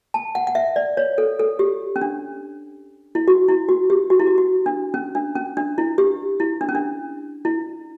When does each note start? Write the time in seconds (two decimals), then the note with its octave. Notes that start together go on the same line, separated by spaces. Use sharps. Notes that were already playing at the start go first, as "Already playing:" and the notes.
0.14 A5
0.35 F#5
0.47 F#5
0.55 E5
0.76 D5
0.97 C#5
1.18 A4
1.40 A4
1.59 G4
1.96 C#4
2.01 D4
3.15 E4
3.28 F#4
3.48 E4
3.69 F#4
3.90 G4
4.10 F#4
4.20 E4
4.27 F#4
4.38 F#4
4.66 D4
4.94 C#4
5.15 D4
5.35 C#4
5.57 D4
5.78 E4
5.98 G4
6.40 E4
6.61 D4
6.69 C#4
6.75 D4
7.45 E4